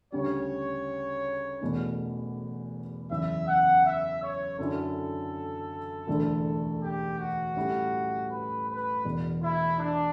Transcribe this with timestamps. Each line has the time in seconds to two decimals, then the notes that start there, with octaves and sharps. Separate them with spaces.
0.12 D2 C#3 G3 C#5
1.61 E1 E2 B2 A3 C#4
3.10 F#1 E2 C#3 E5
3.48 F#5
3.84 E5
4.22 C#5
4.59 F#2 D3 F#3 C#4 E4 A4
6.07 E1 D2 D3 A3 E4
6.82 G4
7.19 F#4
7.56 A2 G3 C#4 E4
8.31 B4
8.68 B4
9.04 E1 E2 B2
9.42 E4
9.80 D4